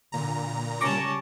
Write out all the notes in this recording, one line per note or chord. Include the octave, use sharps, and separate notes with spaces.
A#2 D3 A#5
C#3 G3 C#4 A5 C#6 D6 A#6